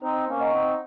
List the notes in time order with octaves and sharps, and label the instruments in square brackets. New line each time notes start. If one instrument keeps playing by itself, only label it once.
[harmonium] C4 D#4 [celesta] C5
[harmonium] A#3 C#4
[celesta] D#5 F#5 A#5 C#6
[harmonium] C4 D#4